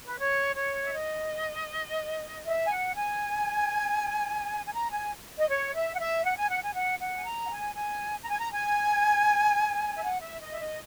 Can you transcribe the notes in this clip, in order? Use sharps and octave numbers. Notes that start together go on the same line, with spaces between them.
B4
C#5
C#5
E5
D#5
E5
G#5
F#5
G#5
G#5
A#5
G#5
D#5
C#5
E5
F#5
E5
F#5
G#5
F#5
G#5
F#5
F#5
G#5
A#5
F#5
G#5
G#5
A#5
G#5
A#5
G#5
E5
F#5
E5
D#5
E5
D#5